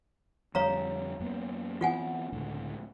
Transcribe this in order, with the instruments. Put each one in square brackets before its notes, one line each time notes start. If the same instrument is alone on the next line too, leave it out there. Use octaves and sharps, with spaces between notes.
[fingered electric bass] F2 D3 G3 [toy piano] C#5 F5 A#5
[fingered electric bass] F#2 A#3 B3
[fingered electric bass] E3 B3 C4 [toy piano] F4 F#5 G#5
[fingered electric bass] C#2 A2 D3